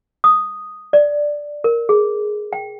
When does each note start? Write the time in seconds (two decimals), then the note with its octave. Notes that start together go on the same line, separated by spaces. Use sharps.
0.24 D#6
0.93 D5
1.64 A#4
1.89 G#4
2.53 G5